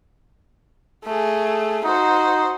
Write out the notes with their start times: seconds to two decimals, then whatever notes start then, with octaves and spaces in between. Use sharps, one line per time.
1.04 A3 G#4
1.85 D#4 F#4 C5